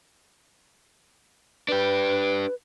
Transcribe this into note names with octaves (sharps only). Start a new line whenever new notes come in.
D4 G4 B4